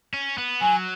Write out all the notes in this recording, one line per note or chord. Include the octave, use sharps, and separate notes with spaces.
C#4
B3
F#3 G#5